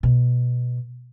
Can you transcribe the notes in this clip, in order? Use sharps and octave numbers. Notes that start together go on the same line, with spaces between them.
B2